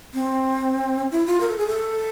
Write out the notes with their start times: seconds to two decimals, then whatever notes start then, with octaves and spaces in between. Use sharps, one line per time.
0.14 C4
1.12 E4
1.26 F4
1.40 A#4
1.48 A4
1.58 G#4
1.66 A4